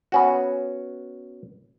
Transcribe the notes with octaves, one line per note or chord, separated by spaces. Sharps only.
B3 C#4 F#4